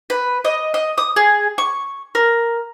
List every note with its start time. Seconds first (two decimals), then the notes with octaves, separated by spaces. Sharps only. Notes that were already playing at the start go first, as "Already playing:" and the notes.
0.10 B4
0.45 D#5
0.74 D#5
0.98 D#6
1.16 G#4
1.58 C#6
2.15 A#4